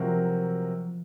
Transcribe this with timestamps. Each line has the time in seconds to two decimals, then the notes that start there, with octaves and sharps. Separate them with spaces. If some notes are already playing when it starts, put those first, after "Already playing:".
Already playing: C3 F3 F#3 C4 F#4 A#4